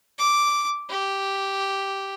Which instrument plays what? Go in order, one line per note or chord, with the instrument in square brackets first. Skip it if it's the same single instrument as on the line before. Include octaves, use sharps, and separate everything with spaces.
[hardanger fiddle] D6
G4